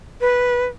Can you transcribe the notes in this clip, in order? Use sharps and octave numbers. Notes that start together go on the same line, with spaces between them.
B4